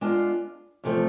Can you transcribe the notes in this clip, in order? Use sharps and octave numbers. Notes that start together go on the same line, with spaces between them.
G#3 B3 D4 F4
E2 C3 F3 A3